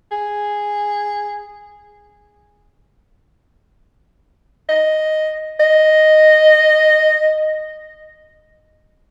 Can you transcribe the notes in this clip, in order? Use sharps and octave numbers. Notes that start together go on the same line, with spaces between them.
G#4
D#5
D#5